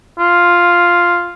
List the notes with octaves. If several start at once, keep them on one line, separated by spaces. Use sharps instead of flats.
F4